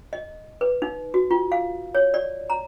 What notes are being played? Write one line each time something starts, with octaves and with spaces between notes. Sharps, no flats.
D#5
B4
D#4
F#4
F4
F5
C#5
D5
A#5